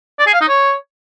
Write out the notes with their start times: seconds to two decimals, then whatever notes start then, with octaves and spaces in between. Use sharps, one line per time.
0.19 D5
0.26 G#4
0.34 F5
0.41 D#4
0.48 C#5